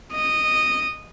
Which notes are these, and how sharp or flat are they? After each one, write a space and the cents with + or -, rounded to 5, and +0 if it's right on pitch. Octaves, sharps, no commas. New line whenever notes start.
D#5 -10